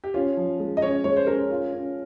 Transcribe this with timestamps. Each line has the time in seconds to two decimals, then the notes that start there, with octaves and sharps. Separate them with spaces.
0.04 G4
0.14 C#4 F4
0.37 F3
0.60 G#3
0.77 D#5
0.82 C#4 C#5
1.04 G#3 C#5
1.17 C5
1.27 C#4 A#4
1.50 F4
1.73 C#4